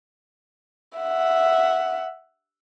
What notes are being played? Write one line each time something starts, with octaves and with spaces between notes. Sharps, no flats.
E5 F#5